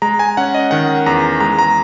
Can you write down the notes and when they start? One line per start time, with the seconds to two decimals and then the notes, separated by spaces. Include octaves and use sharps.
0.02 G#3 A#5
0.19 G#5
0.37 C#4 F#5
0.55 D#5
0.71 D#3 F#5
1.06 E2 A#5
1.40 G#3 A#5
1.59 A#5